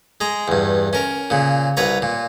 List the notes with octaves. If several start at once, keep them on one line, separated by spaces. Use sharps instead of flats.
G#3 A#5
E2 G2
C#4 A#4
A#2 C#3
C2 B4 C#5 A#5
A#2